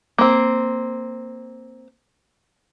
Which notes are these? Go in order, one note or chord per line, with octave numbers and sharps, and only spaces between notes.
A#3 C4